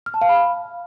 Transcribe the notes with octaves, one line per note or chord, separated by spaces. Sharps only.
F6
A5
F5
B5